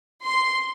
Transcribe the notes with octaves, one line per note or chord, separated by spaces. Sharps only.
C6